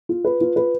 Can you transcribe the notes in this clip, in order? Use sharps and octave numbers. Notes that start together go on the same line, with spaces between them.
F4
B4
F4
B4